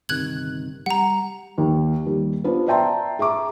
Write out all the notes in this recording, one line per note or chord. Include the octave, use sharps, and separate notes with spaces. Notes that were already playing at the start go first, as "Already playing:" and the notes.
G1 C3 D#3 F#6 G#6 F#7
G3 F#5 A#5
D#2
D#2 G3
B3 D4 F4 B4 C5
D5 E5 G5 A5 A#5 C6
G#4 E5 A#5 D6